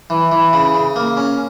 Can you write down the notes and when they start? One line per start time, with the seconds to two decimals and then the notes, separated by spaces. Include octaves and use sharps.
0.10 E3
0.32 E3
0.53 C#3
0.74 C#3
0.96 A#3
1.17 C#4